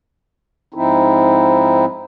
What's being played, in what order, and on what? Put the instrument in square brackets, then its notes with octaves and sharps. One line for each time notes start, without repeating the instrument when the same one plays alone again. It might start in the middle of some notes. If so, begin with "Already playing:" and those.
[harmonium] G#2 F3 C4 D#4 E4